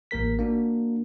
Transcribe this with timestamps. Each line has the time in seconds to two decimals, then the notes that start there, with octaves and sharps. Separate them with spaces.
0.11 A1 A#3 A#4 B6
0.39 A#3 D4 F#4